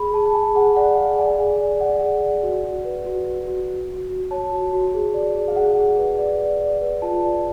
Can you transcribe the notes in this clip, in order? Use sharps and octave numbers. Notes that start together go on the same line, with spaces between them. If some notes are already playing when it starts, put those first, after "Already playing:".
Already playing: G#4 B5
G#4 A5
A5
G#4 G#5
G#4 F#5
D5 F#5
G#4 F5
D5 G#5
G#4
D5
D5 F#5
G#4
D5
F#4
F#4
B4
F#4
F#4
F#4
F#4
F#4
F#4
C#5 A5
F#4
F#4
G#4
D5
G#4
F5
G#4 F#5
G#4
B4
D5
D5
D5
B4
F4 A5
D5